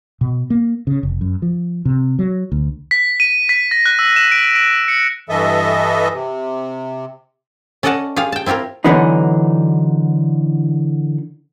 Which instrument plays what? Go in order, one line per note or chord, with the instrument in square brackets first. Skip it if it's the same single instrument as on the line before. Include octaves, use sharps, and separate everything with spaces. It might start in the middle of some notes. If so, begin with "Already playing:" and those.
[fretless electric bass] B2
A#3
C#3
F1
F#2
F3
C3
F#3
D2
[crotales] B6
D#7
B6
A#6
F#6
E6
E7
D7
D7
C#7
[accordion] G2 E3 A4 D#5 E5
C3
[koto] C#4 A4 D5 D#5 F#5 A5
F4 G4 G#4 F5
G5 A5
C4 E4 F4 G4 A#4
[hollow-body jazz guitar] D3 E3 F#3 B3 D4 D#4